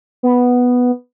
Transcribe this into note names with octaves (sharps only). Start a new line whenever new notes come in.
B3